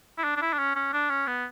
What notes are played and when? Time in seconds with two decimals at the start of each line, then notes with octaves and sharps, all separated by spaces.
0.18 E4
0.24 D4
0.37 D4
0.42 E4
0.53 D4
0.58 C#4
0.75 C#4
0.93 D4
1.10 C#4
1.27 B3